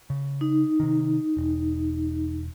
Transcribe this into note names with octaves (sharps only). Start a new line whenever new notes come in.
C#3
D#4
C3 D#3
E1